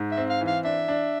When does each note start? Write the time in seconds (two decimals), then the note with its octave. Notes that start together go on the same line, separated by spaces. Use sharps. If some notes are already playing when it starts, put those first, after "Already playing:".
Already playing: G#2
0.11 E5
0.17 C4
0.29 F5
0.41 E3
0.47 F5
0.64 D4 E5
0.88 D4